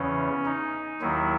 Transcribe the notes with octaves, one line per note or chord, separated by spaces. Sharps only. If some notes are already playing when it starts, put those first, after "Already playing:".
Already playing: E2 C#3 E3 C#4
D#4
D#2 D#3 F#3 E4